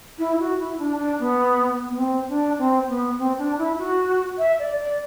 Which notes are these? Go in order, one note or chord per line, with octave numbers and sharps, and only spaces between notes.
E4
F#4
E4
D4
D4
B3
B3
C4
D4
C4
B3
C4
D4
E4
F#4
E5
D5
D5